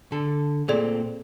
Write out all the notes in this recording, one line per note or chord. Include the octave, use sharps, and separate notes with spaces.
D3 A4
A#2 A3 C4 G#4 A4 D5